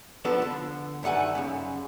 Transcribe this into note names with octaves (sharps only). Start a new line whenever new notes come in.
F3 B3 D4 A4
D3
G2 D#3 A3 F#5 G#5
F#2 C#3